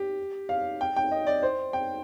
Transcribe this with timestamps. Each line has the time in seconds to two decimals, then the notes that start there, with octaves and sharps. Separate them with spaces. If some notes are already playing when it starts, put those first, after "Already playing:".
Already playing: G4
0.49 F5
0.81 G5
0.96 G5
1.12 D#5
1.27 D5
1.43 C5
1.73 G5